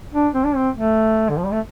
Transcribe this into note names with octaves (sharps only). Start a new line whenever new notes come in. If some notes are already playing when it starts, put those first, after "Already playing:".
D4
C4
D4
C4
A3
D3
F3
G3
A3